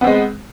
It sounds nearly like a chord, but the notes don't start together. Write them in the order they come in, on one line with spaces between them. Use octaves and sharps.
B3 C4 G#3